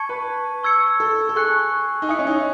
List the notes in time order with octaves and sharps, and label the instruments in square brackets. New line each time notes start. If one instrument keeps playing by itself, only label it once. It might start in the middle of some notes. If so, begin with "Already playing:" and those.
Already playing: [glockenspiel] A5 C#6 G#6 C#7
[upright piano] B4
[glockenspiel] C#6 E6 G#6 C#7
[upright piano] A4
A4
[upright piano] G#4 [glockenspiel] C#6 F#6 C#7
[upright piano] D#4
[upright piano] E4 [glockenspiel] G#5 D#6 F#6 C#7
[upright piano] C#4
D#4